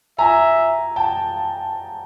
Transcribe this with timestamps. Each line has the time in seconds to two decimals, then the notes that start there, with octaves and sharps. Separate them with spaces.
0.18 E5 G#5 A#5
0.96 G5 A5